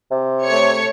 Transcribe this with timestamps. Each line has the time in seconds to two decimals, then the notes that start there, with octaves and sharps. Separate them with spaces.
0.11 C3
0.44 A3 C#5 C#7